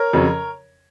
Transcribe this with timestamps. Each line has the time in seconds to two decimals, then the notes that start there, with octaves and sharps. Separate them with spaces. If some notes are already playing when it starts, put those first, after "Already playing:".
Already playing: A#4 C#5
0.13 F2 C#3 F#3 C#4